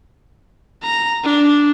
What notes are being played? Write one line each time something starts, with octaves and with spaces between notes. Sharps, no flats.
A#5
D4